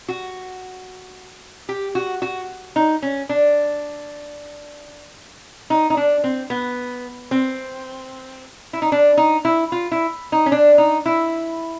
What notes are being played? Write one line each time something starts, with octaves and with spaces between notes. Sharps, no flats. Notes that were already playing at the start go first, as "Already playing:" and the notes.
F#4
G4
F#4
F#4
D#4
C#4
D4
D#4
D#4
D4
C4
B3
C4
E4
D#4
D4
D#4
E4
F4
E4
D#4
C#4
D4
D#4
E4